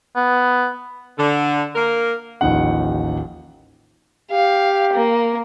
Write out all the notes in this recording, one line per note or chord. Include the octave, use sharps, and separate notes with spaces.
B3
D3
A#3 A#4
A1 D#2 F3 D#4 F#5
G4 F5
A#3